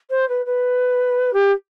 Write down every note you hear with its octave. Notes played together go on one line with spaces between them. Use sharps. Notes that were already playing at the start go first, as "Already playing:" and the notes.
C5
B4
B4
G4